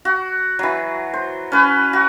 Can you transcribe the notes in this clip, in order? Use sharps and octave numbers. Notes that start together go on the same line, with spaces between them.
F#4
E3 F#3
C5
C#4 B4
F#4